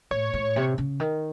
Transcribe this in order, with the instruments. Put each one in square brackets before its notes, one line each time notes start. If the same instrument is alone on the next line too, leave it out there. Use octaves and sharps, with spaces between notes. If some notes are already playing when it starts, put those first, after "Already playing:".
[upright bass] A2 [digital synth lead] C#5
[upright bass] A2
C3
C#3
D#3